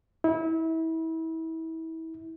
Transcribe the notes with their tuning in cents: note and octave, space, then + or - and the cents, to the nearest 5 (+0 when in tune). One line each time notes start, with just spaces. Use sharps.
E4 -30